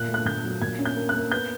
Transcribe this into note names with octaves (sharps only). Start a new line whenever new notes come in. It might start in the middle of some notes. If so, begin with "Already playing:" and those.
Already playing: A#2 F#6
A3
F#6
A#2 G6
F#3
A#2 G#6
C#4
G6
A#3
F#6
A#3
B3 G6